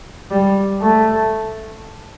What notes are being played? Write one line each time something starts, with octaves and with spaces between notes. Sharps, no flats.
G3
A3